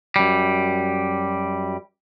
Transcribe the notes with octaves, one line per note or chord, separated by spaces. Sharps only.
F#2 G3